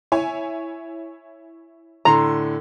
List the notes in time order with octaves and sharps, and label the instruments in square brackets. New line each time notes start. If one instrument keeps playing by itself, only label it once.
[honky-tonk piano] E4 C#5 G#5
[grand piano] A2 D3 C6 [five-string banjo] A#5